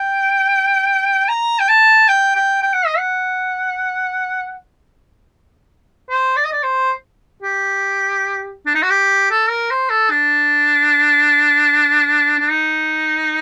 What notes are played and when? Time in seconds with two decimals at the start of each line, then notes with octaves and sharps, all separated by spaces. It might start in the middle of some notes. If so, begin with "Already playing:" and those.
Already playing: G5
1.28 A#5
1.60 G5
1.69 A5
2.09 G5
2.35 G5
2.62 G5
2.74 F#5
2.86 D#5
2.98 F#5
6.10 C5
6.36 D5
6.44 D#5
6.52 D5
6.63 C5
7.43 G4
8.66 D4
8.75 D#4
8.82 F#4
8.90 G4
9.31 A4
9.50 A#4
9.71 C5
9.90 A4
10.11 D4
12.39 D4
12.51 D#4